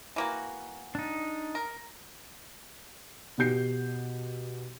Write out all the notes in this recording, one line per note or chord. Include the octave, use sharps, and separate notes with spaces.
E3 A#3 F#4
D4 D#4
A#4
B2 F#4 G4 G6 C7